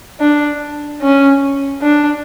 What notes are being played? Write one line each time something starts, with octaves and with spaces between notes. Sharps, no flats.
D4
C#4
D4